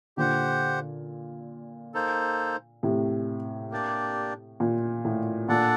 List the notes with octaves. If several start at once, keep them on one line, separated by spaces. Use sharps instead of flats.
A#2 D3 G4 C5 F#5
A#3 D#4 A4 C5
A2 C3
A#3 D4 G4 D5
A#2
A2
A#2 D4 A4 D5 F#5